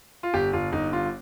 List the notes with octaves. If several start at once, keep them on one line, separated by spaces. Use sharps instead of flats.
F4
G1 G4
G1 F4
G1 D#4
G2 F4